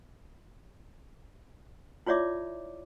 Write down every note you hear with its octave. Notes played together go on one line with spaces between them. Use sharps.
E4 F4 C#5 D5 E5 D6